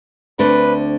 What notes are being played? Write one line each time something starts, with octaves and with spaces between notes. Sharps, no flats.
D2 D3 A3 C4 B4